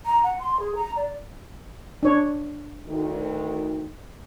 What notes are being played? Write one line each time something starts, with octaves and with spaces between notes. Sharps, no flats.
A#5
F#5
C6
G#4
A#5
D5
D4 C#5
D2 D#3